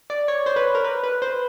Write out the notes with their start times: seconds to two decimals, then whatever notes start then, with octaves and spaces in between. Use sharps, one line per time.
0.10 D5
0.28 C#5
0.46 C5
0.56 B4
0.75 A#4
0.84 B4
1.03 B4
1.22 C5